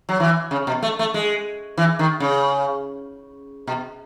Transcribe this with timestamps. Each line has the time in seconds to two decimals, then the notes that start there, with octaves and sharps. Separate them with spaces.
0.09 F#3
0.20 E3
0.51 C#3
0.67 B2
0.82 A3
0.99 A3
1.14 G#3
1.78 E3
1.99 D#3
2.20 C#3
3.67 B2